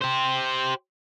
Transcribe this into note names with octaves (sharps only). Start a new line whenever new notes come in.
G4 C5